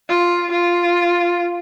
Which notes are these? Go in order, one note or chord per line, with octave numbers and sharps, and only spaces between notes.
F4
F4